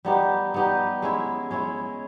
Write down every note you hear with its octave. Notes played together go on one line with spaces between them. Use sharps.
G3 B3 D#4 G4
G3 B3 D#4 G4
G#3 C#4 E4
G#3 C#4 E4